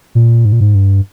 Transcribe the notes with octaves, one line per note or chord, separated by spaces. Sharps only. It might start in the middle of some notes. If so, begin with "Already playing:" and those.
A#2
G#2
A#2
G#2
G2